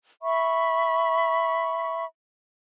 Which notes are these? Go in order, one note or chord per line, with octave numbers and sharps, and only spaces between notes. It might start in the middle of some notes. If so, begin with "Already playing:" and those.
E5 B5 C#6